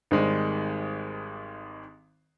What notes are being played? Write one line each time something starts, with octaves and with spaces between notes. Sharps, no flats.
G#1 D#3 G3 G#3